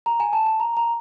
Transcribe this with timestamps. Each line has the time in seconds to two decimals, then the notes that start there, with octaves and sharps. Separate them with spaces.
0.06 A#5
0.20 G#5
0.33 A5
0.46 A5
0.60 A#5
0.77 A#5